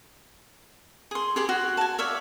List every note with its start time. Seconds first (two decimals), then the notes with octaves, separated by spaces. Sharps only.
1.11 G#4 C6
1.36 G4 G#4 C6
1.49 F#4
1.77 G#5 A5
1.98 C#5 D5 E5 F5